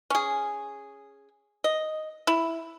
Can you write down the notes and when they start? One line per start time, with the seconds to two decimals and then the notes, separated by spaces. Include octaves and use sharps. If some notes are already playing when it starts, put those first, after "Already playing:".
0.10 C#4 G#4
1.64 D#5
2.27 E4